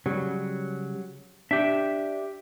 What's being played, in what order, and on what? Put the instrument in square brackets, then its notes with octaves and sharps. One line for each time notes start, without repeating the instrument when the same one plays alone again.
[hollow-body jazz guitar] C#3 G3 [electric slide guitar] F#3
[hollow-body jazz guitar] D4 [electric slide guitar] G4 E5